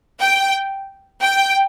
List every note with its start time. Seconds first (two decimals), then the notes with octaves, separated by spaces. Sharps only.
0.21 G5
1.21 G5